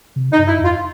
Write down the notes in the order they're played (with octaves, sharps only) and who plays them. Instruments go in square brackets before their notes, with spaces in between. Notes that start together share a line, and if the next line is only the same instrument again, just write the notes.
[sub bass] C3
[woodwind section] D#4
[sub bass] G2
[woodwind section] E4
[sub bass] F2
[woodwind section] F4